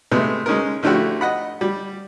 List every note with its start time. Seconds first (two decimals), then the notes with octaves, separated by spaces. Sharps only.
0.12 C3 G#3 A3 B3
0.46 G#3 C#4 D#4 A#4
0.83 D3 F3 A3 E4 F#4 G4
1.21 D#5 F#5 B5
1.61 G3